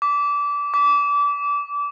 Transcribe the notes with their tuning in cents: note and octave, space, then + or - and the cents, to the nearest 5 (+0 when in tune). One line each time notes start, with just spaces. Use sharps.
D6 -25
D6 -30